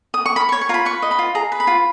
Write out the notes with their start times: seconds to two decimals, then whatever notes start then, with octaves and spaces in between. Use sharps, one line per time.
0.14 D#6
0.26 C#6
0.36 A#4 B5
0.49 C#6
0.52 C#5
0.61 C#6
0.69 F4 A#5
0.74 B5
0.85 B4 C#6
1.02 D#5
1.11 B5
1.19 F4
1.35 G#4 A#5
1.52 B4
1.60 B5
1.67 F4